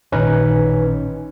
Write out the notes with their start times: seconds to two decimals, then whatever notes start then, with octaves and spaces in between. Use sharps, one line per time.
0.12 A1 A#2 D#3 C#4 D#4 B4